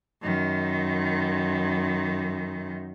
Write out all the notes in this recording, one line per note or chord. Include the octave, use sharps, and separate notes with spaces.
F#2 D#3